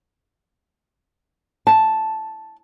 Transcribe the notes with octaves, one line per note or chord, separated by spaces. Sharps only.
A5